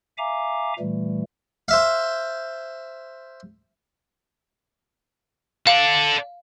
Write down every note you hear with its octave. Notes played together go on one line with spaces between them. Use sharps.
E5 F5 G#5 A#5 D6
A#2 E3 G3 A3
C5 E5 F5
A4 D5 F5